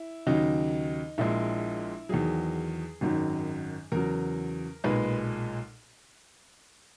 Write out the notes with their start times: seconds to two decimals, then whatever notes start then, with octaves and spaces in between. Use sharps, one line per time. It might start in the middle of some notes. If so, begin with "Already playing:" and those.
Already playing: E4
0.26 D#2 C#3 F#3 D#4
1.18 A#1 A#2 G#3 E4
2.09 E2 D#3 F#3 G#4
3.01 G#1 F#2 D#3 F#3
3.92 E2 C#3 F#3 A#4
4.84 B1 A#2 G#3 B4